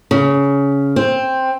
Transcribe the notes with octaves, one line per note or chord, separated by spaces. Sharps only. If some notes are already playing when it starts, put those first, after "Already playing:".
C#3
C4